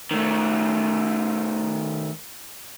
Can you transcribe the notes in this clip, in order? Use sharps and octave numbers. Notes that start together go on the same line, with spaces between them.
D#3 A3